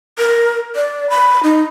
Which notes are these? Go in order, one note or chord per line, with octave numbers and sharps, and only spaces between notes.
A#4
D5
B5
D#4